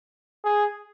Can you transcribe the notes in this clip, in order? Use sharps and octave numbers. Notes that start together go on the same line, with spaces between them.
G#4